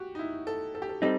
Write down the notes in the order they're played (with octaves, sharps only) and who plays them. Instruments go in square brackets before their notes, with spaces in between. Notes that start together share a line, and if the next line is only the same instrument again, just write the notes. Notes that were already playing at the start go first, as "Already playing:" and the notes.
Already playing: [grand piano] F#4 G4
D#4
E4
A4
A4
G4
A4
[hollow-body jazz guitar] G3 C4 D#4 [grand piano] A4